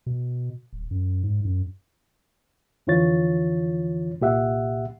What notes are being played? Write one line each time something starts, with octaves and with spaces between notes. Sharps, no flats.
B2
D1
F#2
G#2
F#2
F2 D3 E3 F4 C#5 A6
C2 A#2 G4 E5 F#5